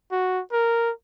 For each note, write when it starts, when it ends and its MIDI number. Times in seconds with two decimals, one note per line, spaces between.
0.11 0.42 66
0.52 0.91 70